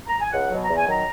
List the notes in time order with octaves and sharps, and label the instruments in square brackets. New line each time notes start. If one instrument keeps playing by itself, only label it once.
[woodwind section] A#5
G#5
C#2 F#5
B2 F#3
A#5
E2
G#5
D#3 F#3 A#5